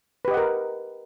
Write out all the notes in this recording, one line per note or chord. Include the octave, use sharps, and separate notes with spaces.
G4 A#4 B4 D#5 F#5